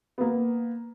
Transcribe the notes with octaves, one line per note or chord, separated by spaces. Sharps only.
A#3 B3